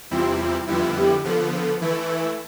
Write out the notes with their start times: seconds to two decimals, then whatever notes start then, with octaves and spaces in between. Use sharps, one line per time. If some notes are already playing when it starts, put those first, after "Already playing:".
0.11 E2 C3 G3 C4 E4 F4
0.40 F4
0.67 F2 D3 G3 B3 E4 F4
0.96 G4
1.25 D3 F3 B3 A4
1.53 A4
1.81 E3 A3 E4 B4